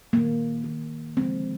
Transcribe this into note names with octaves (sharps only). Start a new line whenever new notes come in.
D#3 A#3
D#3 A#3
D3 F3 G#3 C4